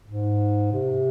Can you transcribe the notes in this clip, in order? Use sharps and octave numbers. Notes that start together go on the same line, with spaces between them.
G#2
C3